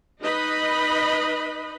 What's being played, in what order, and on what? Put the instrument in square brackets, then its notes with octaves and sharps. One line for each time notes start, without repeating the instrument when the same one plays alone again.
[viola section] D#4 B4 D#5 B5